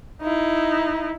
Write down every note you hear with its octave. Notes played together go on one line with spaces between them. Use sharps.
D#4 E4